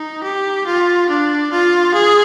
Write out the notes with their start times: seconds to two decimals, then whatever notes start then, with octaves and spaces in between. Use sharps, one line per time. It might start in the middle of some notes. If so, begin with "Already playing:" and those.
Already playing: D#4
0.24 G4
0.67 F4
1.09 D4
1.52 F4
1.94 G#4